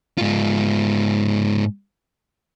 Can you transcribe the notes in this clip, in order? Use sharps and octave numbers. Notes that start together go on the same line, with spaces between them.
G#2 F4